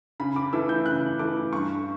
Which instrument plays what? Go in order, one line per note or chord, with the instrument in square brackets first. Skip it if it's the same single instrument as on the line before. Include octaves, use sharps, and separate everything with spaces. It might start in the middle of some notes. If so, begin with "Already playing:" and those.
[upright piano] C#3 B5
D6
E3 A3 E6
G6
C#3 F#6
E3 A3 D6
G2 C#6